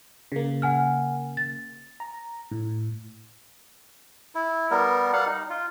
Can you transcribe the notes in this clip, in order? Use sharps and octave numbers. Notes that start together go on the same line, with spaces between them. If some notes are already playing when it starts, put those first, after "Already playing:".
C#3 A#3
F#5 G#5 F6
A6
A#5
A2
E4
G3 B3 A#4
G3 F5 F#5
D#4
F4